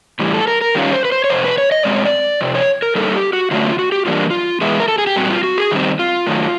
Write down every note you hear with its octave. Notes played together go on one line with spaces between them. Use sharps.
A2 E3 G3
A4
A#4
A#4
D#3 G3 A#3 C#4 F4
C5
B4
C5
C#5
F2 C3 C5
B4
C#5
D#5
B2 G#3 C4 D5
C#5
D5
F2 C3
C#5
A#4
D3 G3 A#3 D#4 A4
G4
F#4
D3 F#3 A3 D4 F4
F4
F#4
G4
E3 G3 A#3 D4 F4
F4
E3 G#3 B3 E4
A#4
A4
G#4
G4
A#2 G3 C4 F#4
F4
F#4
G#4
D#3 G3 C4
F4
D#3 F#3 A3